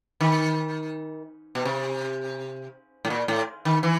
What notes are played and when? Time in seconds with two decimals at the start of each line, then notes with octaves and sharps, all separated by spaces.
0.21 D#3
1.55 B2
1.65 C3
3.05 A2
3.10 A#2
3.28 A2
3.65 D#3
3.83 E3